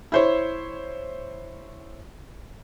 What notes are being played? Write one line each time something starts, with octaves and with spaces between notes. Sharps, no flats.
E4 C5 C#5